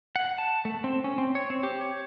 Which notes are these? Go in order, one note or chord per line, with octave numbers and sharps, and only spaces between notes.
F#5
A5
A3
C4
C#4
C4
C#5
C4
G4
C#5